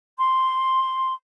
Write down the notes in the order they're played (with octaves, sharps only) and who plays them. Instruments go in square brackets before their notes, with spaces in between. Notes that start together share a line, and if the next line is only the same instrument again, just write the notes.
[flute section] C6